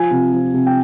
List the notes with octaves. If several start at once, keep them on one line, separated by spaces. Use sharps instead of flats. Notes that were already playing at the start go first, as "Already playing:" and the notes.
Already playing: F3 G#5
C3
F3
C3
G5